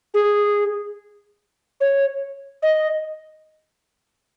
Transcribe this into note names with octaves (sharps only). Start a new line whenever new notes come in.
G#4
C#5
D#5